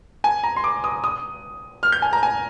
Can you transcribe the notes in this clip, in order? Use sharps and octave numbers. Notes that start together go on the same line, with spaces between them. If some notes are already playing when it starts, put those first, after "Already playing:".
G#5
A#5
C6
D6
D#6
D#6
F6
G6
G#5
A#5
G#5